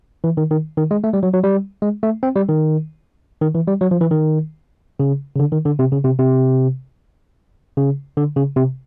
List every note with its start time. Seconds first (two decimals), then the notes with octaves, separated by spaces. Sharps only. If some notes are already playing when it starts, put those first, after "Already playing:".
0.24 E3
0.37 D#3
0.51 D#3
0.78 D#3
0.91 G#3
1.04 A3
1.13 G3
1.23 F#3
1.33 F#3
1.44 G3
1.82 G#3
2.03 A3
2.23 C4
2.36 G3
2.48 D#3
3.42 D#3
3.55 E3
3.68 G3
3.81 F#3
3.91 F3
4.01 E3
4.11 D#3
5.00 C#3
5.36 C#3
5.39 D3
5.52 D#3
5.65 D3
5.79 C3
5.92 C#3
6.05 C3
6.19 C3
7.77 C#3
8.17 D3
8.36 C#3
8.56 C3